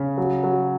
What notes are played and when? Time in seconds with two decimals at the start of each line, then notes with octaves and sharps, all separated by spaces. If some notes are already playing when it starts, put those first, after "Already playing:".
Already playing: C#3
0.18 F#3
0.44 F#3